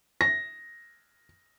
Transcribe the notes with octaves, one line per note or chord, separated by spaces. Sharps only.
A#6